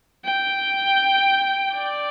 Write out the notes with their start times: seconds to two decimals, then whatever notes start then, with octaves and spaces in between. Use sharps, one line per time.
0.25 G5
1.74 D5